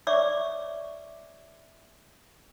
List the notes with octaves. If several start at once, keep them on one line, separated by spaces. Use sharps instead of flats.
C#5 D5 E5 C#6 D6